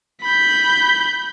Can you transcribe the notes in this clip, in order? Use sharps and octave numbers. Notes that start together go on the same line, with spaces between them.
B5 G6